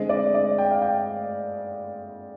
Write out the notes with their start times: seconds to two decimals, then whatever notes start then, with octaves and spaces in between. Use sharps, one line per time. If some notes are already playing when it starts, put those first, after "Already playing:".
Already playing: D3 G#3 C4 D#5
0.09 D5
0.34 D5
0.58 G5
0.71 F5
0.82 G5